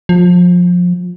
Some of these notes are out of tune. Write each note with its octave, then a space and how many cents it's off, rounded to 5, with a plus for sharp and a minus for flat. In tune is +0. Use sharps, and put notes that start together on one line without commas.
F3 +25